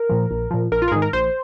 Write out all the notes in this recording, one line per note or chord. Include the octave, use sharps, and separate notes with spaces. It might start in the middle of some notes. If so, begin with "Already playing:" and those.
Already playing: A#4
A#2 F3
A#1
A#2 F3
A#1 A#4
F4
A#4
G#2 D#3 G#4
A#4
A#1 C5